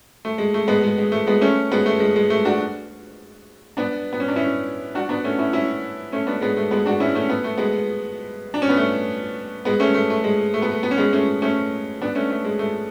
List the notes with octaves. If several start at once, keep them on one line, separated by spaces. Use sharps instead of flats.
A3
G#3
A3
G#3 B3
G#3
G#3
A3
G#3 B3
A3 C#4
G#3 B3
A3
G#3
G#3
A3
D4 F#4
B3 D4
B3
C#4
D4
C#4 E4
D4 F#4
B3 D4
A3 C#4
C#4 E4
C#4 E4
A3 C#4
B3 D4
G#3 B3
A3
G#3 B3
D4 F#4
C#4 E4
A3 C#4
B3
A3
G#3 B3
D4
C#4
B3
A3
G#3 B3
A3 C#4
A3
A3
G#3
A3
B3
A3
B3
C#4
G#3 B3
A3 C#4
A3 C#4
B3 D4
A3 C#4
A3
G#3
A3